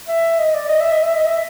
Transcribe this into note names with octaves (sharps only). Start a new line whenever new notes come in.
E5
D#5
D5
D#5
E5
D#5
E5
D#5
E5